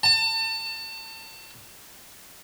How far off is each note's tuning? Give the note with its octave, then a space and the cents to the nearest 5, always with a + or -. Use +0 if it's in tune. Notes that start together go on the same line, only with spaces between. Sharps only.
A5 +30